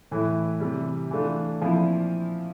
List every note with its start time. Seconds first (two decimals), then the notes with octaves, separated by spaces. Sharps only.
0.11 A2 E3 A3 E4
0.60 C3 E3 G3
1.11 E3 A3 D4 F4
1.61 A#2 F3 C4 E4